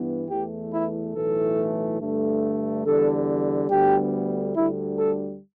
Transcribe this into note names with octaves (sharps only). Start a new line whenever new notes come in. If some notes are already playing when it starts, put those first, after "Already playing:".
Already playing: G2 E3 B3
E2 E3 A3 G4
E4
B1 A2 E3 A3 A4
G2 D3 A3
E2 D3 G3 A4
D2 D3 G3 B3 G4
D2 D3 G3 E4
A4